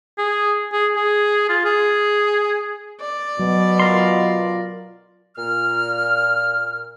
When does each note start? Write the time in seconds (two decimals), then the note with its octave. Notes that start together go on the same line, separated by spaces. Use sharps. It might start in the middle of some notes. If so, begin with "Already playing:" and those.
0.18 G#4
0.72 G#4
0.96 G#4
1.49 F4
1.65 G#4
3.00 D5
3.40 B2 F#3
3.80 F4 A#4 C6
5.36 A#2 F6